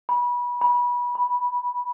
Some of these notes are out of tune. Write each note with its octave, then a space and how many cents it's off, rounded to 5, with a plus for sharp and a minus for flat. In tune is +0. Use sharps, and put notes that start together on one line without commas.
B5 -25
B5 -25
B5 -10